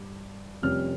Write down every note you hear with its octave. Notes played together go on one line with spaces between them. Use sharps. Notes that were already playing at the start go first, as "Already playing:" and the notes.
Already playing: G2
F1 F2 C3 G3 C#4 F6